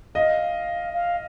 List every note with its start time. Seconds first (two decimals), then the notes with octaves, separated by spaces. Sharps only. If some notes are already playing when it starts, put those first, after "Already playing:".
0.15 D#5 F5
0.93 F5